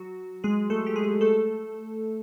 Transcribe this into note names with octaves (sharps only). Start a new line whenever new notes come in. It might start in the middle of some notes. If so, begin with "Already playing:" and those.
Already playing: F#3 F#4
G#3 G#4
A3 A4
G4
G#3 G#4
A3 A4